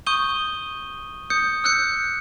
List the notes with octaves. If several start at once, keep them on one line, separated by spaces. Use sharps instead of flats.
C#6 D#6 G6 D#7 G7
D#6 G6 C#7
E6 F#6 G6 C#7